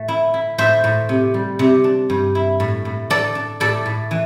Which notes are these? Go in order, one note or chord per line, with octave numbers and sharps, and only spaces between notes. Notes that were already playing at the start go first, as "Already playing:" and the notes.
Already playing: A2 A3
E4
E4
A2 C5 E5
A2
C3
G3
C3
D4
G2
E4
A2
A2
D4 A4 D5
D4
A2 A4 D5
A2
E3